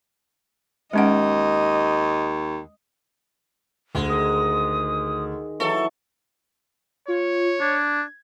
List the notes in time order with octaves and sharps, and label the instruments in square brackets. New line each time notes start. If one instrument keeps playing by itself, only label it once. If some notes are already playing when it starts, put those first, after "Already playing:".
[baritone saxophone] D#2 [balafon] G#3 C#4 F#5 [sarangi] D#5
[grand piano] D2 [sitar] G#3
[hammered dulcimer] D#3 [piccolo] D#6
[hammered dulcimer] E3 F#3 C#5 [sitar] A4 [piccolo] C#6
[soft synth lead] F4 [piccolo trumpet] C#5
[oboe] D4 [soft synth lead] G#6